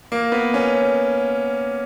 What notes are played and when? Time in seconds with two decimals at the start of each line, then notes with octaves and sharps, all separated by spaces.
0.12 A#3
0.32 B3
0.54 C#4